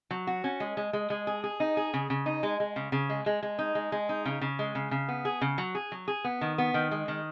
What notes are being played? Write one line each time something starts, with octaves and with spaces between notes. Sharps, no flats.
F#3
F#4
C#4
G#3
G#3
G#3
G#3
G#4
G#4
D#4
G#4
C#3
C#3
D#4
G#3
G#3
C#3
C#3
G#3
G#3
G#3
D#4
G#3
G#3
D#4
C#3
C#3
G#3
C#3
C#3
B3
G#4
C#3
F#3
G#4
F#3
G#4
B3
D#3
B3
D#3
G#3
D#3